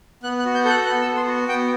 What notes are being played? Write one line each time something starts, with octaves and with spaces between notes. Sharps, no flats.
B3 F#6
F#6
F#4
G6
A4 G6
F#6
B3 F#6
E6
B3
C6
F#4
B3 G5